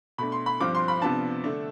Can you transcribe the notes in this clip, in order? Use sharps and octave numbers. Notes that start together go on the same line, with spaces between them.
B2 A3 D4 B5
C6
B5
G2 F3 C4 D6
C6
B5
C3 F3 B3 D4 A5
D3 A3 D4